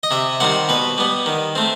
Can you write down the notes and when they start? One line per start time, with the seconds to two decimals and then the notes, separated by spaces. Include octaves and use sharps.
0.03 D#5
0.11 C3 E5
0.40 D#3 G3 C4 F#5
0.69 B2 B4
0.98 G3 B3
1.26 D#3
1.55 A3 C4